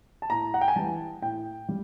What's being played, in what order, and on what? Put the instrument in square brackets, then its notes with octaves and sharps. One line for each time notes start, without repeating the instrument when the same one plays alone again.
[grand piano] A5
A2 A#5
F#5
G5
G#5
E3 G3 A5
A2 G5
G3